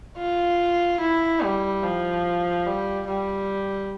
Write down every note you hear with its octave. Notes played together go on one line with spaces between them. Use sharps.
F4
E4
G3
F3
G3
G3